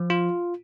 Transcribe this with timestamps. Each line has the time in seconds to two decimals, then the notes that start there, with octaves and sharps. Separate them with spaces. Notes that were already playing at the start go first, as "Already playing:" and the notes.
Already playing: F3
0.10 F4